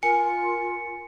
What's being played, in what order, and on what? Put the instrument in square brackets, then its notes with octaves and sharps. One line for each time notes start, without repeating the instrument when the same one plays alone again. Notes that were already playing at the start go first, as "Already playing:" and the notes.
[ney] F4 [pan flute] A#4 [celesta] G#5 [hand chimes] C#7